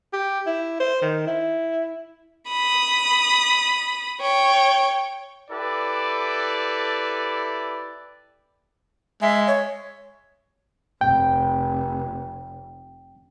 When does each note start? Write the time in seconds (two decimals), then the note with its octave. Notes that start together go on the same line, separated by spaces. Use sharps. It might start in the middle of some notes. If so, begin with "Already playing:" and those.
0.13 G4
0.46 E4
0.80 C5
1.02 D#3
1.27 E4
2.49 B5 D#6
4.21 C#5 G5
5.50 E4 G4 A4 B4 D5
9.22 G#3 E5
9.47 C#5
11.01 F1 G5